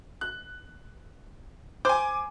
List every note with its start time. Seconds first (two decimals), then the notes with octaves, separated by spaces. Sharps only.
0.21 F#6
1.85 C5 G#5 D6